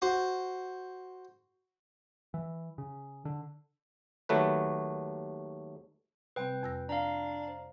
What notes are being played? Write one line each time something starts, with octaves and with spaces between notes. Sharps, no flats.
F#4 C5
E3
C#3
D3
D#2 F#3 A3 B4
C3 G3 C4 B4 G5
F2 E6 A#6
D4 F5 A#5
C5